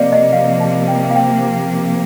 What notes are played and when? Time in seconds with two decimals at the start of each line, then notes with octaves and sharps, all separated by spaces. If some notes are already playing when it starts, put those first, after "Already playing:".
Already playing: C3 F3 A#3 D5 D#5 F5
0.13 D#5
0.33 F5
0.60 A5
0.88 G5
1.11 F5
1.16 G5